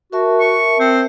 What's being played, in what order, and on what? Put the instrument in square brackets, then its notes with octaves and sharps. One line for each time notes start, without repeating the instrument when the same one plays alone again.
[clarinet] F#4 [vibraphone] A#4 E5 A5
[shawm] C#6
[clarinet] C4 [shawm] C5